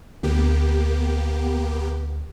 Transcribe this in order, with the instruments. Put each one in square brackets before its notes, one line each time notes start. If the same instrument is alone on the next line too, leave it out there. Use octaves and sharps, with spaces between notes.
[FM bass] D2 [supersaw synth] A#3 B3 G4